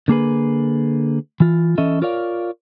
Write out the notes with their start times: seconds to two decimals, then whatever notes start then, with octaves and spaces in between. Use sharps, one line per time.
0.08 D3 A#3 G#4 B4
1.40 E3 F4
1.78 E3 C#4 A4 D#5 E5
2.02 F4 A#4 C#5 D5 F5